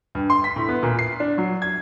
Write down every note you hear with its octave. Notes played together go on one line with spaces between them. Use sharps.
G2
C6
B6
A2
B3
A#2
C7
D4
F#3
G#6